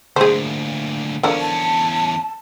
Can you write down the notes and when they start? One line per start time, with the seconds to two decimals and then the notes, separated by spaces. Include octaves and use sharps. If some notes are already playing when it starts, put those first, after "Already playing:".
0.16 D2 A#2 G#4 C5
1.23 E2 D3 F3 C#4 A#4
1.41 A5